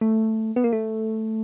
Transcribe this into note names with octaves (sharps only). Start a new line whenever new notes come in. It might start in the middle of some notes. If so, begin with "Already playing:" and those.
A3
B3
A#3
A3